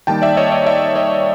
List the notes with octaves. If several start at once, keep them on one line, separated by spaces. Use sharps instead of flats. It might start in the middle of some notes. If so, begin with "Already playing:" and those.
D#3 G3 A#3 D#4 G5 A5
D5 E5
C#5 D#5
D5 E5
D5 E5
C#5 D#5